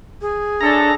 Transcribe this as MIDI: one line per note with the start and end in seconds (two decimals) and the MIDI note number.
0.21 0.95 68
0.61 0.92 61
0.61 0.90 62
0.61 0.92 64
0.61 0.92 69
0.61 0.95 82